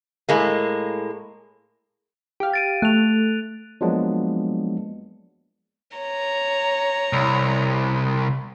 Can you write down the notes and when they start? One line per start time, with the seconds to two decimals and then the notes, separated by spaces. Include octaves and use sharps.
0.29 A2 G#3 A#3
2.40 G4 F5
2.53 A6 D7 D#7
2.82 A3 F#6 F7
3.81 F3 F#3 G#3 A#3 B3 D4
5.97 C#5 A#5
7.13 C2